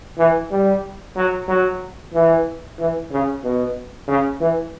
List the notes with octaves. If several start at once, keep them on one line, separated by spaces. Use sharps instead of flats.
E3
G3
F#3
F#3
E3
E3
C#3
B2
C#3
E3